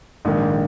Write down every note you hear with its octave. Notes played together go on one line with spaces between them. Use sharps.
A#1 G#2 D#3